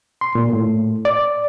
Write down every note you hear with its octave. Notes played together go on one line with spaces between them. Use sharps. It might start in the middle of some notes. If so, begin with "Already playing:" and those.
C6
A#2
A2
D5